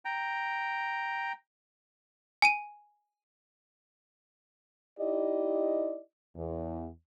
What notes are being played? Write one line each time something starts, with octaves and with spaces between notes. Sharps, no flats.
G5 A#5
G#5 D7 D#7
D#4 E4 G4 D5 D#5
E2